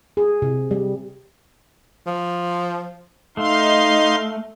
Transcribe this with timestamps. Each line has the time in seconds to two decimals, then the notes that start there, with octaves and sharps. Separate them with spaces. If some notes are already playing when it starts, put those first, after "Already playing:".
0.17 G#4
0.42 C3
0.71 G3
2.07 F3
3.37 A3 D#4 F5 C6